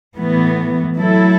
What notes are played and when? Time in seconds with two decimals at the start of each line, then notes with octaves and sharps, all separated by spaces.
0.17 A2 E3 B3
0.97 F#3 A3 E4 A4